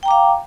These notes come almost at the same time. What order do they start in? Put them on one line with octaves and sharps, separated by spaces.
G5 A#5 D6 F5